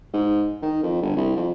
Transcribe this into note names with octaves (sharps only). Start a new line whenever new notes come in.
G#2
D#3
F2
G1
C2
F2